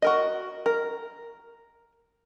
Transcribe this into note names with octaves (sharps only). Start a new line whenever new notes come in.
F#4 A#4 D#5
A#4